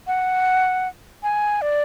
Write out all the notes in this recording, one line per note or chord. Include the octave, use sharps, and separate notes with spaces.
F#5
G#5
D5